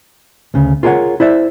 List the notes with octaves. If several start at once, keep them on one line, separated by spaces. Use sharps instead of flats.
D2 C#3
F4 G#4 A#4 C5 C#5 F#5
E4 C5 D5 E5